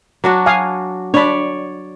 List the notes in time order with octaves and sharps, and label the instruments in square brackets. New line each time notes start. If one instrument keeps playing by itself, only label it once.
[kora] F#3 D4 F#4
[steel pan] F5 G#5 D#6
[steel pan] D4 B5 [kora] C#5 D5